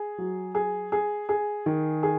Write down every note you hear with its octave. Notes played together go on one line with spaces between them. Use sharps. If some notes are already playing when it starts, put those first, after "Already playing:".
Already playing: G#4
F#3
G#4
G#4
G#4
D#3
G#4